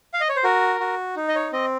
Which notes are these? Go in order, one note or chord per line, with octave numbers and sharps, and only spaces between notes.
F5
D#5
C#5
C5
F#4 A#4
F#4
D#4
D#5
C#5
C4 D#5